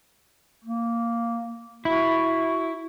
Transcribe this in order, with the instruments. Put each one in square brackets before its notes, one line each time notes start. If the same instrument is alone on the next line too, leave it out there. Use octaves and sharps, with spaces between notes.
[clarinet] A#3
[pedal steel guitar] E4 [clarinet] F#4